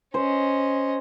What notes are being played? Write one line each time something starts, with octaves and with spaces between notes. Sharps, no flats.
C#4 C5 D#5